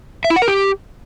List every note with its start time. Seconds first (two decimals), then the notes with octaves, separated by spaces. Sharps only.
0.25 E5
0.30 E4
0.36 F#5
0.42 A#4
0.48 G4